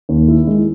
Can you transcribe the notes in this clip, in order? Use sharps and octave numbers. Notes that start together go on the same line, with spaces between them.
D#2
E4
G#3